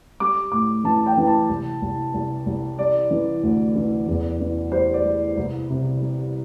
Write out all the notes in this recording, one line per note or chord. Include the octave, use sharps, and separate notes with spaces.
G3 D6
A2 D6
E3 A5
G5
E3
A5
C2
C2
C2
C2
G3 D5
E3
D2
E3
E2
E3
G3 C5
D5
G3
C2
C3
G3